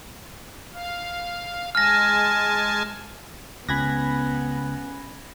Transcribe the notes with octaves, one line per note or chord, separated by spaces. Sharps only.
F5
G#3 G#5 A5 F6 A#6
C#2 B3 C#4 G#5 B5 F#6 G#6 A#6